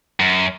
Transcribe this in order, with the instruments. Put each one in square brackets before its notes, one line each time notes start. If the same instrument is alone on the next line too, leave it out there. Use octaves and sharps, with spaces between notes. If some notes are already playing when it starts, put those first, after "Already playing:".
[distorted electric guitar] F#2